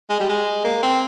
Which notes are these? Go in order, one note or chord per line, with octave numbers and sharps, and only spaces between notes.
G#3
G3
G#3
A#3
C4